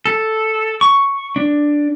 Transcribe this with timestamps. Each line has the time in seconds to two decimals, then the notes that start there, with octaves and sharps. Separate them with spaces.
0.06 A4
0.81 C#6
1.36 D4